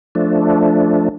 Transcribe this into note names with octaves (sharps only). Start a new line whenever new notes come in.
F3 A3 D4